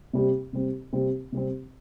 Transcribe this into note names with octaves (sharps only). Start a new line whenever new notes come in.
C3 G3 C4
C3 G3 C4
C3 G3 C4
C3 G3 C4